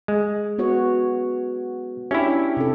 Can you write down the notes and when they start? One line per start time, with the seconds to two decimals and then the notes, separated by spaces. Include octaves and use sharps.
0.08 G#3
0.58 B3 F#4 C#5
2.11 C#4 D4 E4 G4 E5
2.57 C3 A4